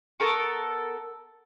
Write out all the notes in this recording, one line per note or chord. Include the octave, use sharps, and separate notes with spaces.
B3 A4 A#4 C#6